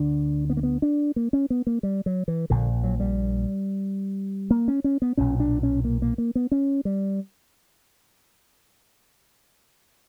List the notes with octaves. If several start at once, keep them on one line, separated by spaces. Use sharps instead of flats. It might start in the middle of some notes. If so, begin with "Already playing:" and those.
Already playing: D2 D3 D4
B3
A#3
B3
D4
A#3
C#4
B3
A#3
G3
F#3
E3
A#1 A#2 D3
F#3
G3
A#3
C#4
C#4
B3
B1 A#2 C#4
D4
C#4
A#3
A#3
A#3
B3
C#4
G3